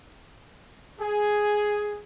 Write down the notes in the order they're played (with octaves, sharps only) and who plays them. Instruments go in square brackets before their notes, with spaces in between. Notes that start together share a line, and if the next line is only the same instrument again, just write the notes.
[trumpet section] G#4